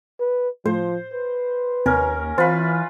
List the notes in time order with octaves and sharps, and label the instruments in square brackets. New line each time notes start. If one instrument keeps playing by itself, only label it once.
[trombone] B4
[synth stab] A2 [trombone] F3 [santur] C5
[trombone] B4
[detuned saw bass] D#2 [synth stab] C3 [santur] C#4 A#4
[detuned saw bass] E3 [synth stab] C4 [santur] F4 B4